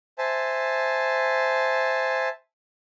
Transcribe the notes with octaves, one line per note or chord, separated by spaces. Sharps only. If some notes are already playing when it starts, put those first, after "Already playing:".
C5 E5 G#5 A5